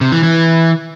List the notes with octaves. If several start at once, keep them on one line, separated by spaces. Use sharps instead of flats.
C3
E3
E3